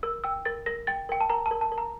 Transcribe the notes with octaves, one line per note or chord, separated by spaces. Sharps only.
A#4 E6
G5 E6
A#4 A6
A#4 A#6
G5 A6
A#4 G5
A5
A#4 A#5
A5
A#4
A5
A#4
A#5